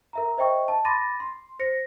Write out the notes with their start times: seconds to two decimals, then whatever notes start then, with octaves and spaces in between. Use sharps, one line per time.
0.13 A#4 E5 A#5
0.38 C5 D#5 E5 G5 C#6
0.68 A5
0.85 B5 C6 D6 A6 A#6 D#7
1.20 C6
1.59 C5 A#6 C#7